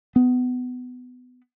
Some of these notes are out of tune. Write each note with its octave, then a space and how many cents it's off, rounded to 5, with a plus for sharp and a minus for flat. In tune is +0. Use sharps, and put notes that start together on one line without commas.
B3 +20